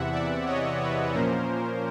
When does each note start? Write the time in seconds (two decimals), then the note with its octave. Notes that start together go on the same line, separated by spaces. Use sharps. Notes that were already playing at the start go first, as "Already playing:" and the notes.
Already playing: E2 C3 E3 E5 F#5
0.12 D5 E5
0.46 C#5 D#5
0.80 B4 C#5
1.14 A#2 F3 A#3 C#4 A#4 C5